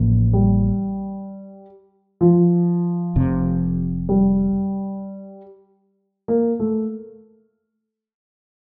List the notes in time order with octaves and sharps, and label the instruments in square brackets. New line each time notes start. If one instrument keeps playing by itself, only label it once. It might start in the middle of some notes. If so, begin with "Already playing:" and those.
Already playing: [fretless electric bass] A1 A2 F3 A#3
[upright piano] G3
F3
[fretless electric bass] F1 F2 C3
[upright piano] G3
A#3
A3